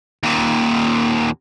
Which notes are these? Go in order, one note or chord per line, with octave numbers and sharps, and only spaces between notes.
D#2 A#2